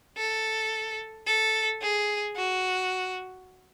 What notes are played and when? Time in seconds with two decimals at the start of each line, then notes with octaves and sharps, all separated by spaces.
0.17 A4
1.27 A4
1.82 G#4
2.36 F#4